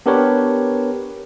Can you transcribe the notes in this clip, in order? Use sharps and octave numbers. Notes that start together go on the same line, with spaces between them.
B3 D4 G4 A#4 B4 C#5